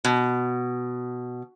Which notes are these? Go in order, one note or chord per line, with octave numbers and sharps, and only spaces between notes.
B2